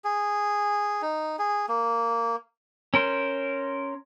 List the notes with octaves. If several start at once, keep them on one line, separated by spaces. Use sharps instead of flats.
G#4
D#4
G#4
A#3
C#4 A#4 C5